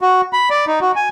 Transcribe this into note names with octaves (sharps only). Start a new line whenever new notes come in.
F#4
B5
D5
D#4
F#4
G#5